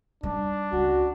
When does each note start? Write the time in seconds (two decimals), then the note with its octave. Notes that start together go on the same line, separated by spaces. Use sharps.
0.23 G3 D4 D#4
0.73 C#2 F#4